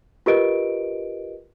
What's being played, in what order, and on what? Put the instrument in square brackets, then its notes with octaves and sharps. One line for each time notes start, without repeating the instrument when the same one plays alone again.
[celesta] F4 G4 A#4 B4 D#5 D7